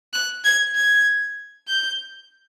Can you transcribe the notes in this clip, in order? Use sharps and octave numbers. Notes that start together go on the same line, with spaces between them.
F#6
G#6
G#6
G6